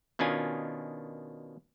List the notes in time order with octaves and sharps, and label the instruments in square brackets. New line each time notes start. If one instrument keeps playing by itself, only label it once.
[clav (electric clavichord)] B2 D#3 C#4 D4 F4 G#5